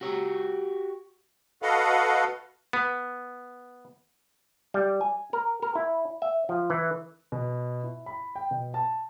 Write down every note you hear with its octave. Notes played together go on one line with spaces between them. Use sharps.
F#4 G4 C#5
F#4 A4 B4 D#5 F5 F#5
B3
G3
G#5
A#4
A#4
E4
E5
F3
E3
B2
E4
B5
G5
B2
A5